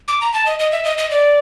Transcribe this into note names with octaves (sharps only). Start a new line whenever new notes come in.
D6
A#5
A5
D#5
D#5
E5
D#5
D#5
D5